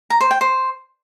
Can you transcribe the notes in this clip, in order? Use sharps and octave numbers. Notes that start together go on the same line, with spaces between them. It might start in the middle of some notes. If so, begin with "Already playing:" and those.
A#5
C5
G5
C5